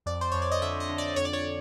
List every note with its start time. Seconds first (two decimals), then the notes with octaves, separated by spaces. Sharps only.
0.06 F2 D5
0.21 C5
0.32 F2 C#5
0.42 D5
0.52 D#5
0.62 D3 E5
0.80 D#5
0.89 D3
0.98 D5
1.16 F2 C#5
1.25 D5
1.33 C#5